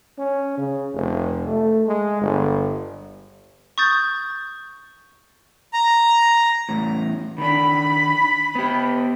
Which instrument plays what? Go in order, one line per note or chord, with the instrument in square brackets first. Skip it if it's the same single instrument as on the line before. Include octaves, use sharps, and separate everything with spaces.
[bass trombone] C#4
C#3
F1
A3
G#3
G1
[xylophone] C#6 D#6 G6 A6
[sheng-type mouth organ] A#5
[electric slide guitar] E2 A2
[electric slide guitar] D#3 D4 [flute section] B5
[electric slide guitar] B3 G4